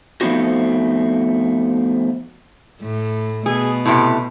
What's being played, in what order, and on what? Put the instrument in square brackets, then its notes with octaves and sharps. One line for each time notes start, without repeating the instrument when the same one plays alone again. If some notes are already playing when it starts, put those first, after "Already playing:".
[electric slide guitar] F3 A3 B3 C4 D#4 F#4
[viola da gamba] A2 A3
[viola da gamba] B2 [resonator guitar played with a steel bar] G#4
[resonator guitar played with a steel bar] A2 C3 G4